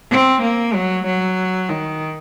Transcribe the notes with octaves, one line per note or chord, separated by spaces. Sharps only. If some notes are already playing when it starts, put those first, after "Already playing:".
C4
A#3
F#3
F#3
D#3